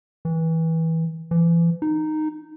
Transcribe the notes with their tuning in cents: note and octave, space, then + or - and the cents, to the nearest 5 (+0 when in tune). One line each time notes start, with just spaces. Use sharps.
E3 -20
E3 +35
D#4 -10